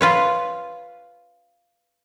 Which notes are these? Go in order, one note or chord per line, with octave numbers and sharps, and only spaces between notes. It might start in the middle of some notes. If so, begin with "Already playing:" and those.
F4 B4 C#5